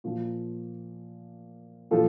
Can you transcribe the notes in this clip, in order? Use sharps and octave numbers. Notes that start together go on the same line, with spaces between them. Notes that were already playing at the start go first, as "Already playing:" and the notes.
A#2 F3 F4
A#2 F3 F4 A4